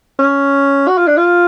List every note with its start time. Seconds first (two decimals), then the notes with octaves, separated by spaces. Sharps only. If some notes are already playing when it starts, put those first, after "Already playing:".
0.19 C#4
0.88 F#4
0.98 F4
1.07 D4
1.17 F4